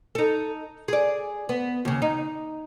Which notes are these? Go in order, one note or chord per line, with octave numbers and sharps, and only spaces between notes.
D#4 A4
G#4 D5
B3
D#2 C#3
D#4